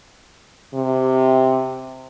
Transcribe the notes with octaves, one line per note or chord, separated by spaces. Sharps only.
C3